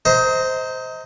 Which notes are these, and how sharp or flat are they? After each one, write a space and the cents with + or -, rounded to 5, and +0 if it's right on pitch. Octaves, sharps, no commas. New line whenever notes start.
C5 -10 D#5 +30 A#5 -15